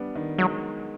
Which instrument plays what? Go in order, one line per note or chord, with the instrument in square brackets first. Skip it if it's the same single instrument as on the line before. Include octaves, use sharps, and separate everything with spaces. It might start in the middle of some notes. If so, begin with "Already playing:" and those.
Already playing: [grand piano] G3 B3 D4
D#3
[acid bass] F#3 [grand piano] G#3